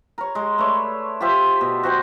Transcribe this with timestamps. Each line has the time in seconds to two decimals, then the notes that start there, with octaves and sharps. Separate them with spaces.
0.18 A#4 C#5
0.35 G#3
0.58 A3 B4 C#5 D5
1.21 F4 G4 C5 E5
1.61 B2
1.83 F#4 C5 G5 C6